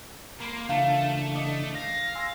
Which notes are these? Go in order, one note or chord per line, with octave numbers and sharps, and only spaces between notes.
A#3 B5 C6
C#3 E3 A3 D4 F4 A#4 F5 A5
A3 D#5 D6
F5 A#6
G#5 C6 E6